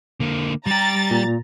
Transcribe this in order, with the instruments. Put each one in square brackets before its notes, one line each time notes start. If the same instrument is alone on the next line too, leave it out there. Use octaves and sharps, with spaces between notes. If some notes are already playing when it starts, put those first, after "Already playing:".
[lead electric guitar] D3 A#3
[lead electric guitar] G3 G4 [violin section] A#5 A6
[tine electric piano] A#2